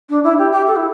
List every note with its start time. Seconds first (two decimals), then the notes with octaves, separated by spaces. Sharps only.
0.10 D4
0.24 E4
0.38 G4
0.52 G4
0.67 A4
0.76 E4